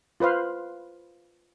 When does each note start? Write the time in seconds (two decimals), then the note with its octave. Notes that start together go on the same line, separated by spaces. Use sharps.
0.20 F4 B4 C5 F5